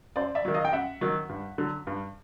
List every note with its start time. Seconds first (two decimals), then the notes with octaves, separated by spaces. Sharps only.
0.16 F#2 C5 D5
0.35 D5 E5
0.45 D#3 F#3
0.54 D#5 F5
0.65 G5
0.73 F#2 E5 F#5
1.01 D#3 F#3
1.29 G2
1.58 D3 F#3
1.87 G2